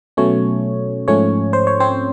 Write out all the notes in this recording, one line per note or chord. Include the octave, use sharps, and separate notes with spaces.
B2 F#3 A3 C#4 C#5
G#2 F3 A3 C#4 C#5
C5
C#5
C4 C5